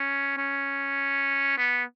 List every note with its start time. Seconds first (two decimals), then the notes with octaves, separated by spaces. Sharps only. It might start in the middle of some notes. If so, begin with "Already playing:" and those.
Already playing: C#4
0.37 C#4
1.57 B3